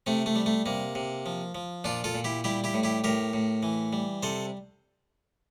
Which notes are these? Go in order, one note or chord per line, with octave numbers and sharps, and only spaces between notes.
C3 A3 C4
A3
G3
A3
C3 A#3
C3
F3
F3
A#2 D4 F4
F4 A4
A#2
E4 G4
G3 E4 G4
E4 G4
A2
E4 G4
A2 G4 A#4
A2
E3
G3
C3 A4 C5